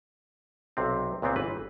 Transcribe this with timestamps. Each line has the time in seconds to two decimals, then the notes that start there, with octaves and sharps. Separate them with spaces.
0.77 B1 C3 C4
1.22 C#2 A#2 B3 C4
1.36 G1 E3 B4